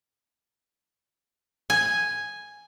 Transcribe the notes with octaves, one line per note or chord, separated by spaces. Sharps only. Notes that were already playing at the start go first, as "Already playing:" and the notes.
G#5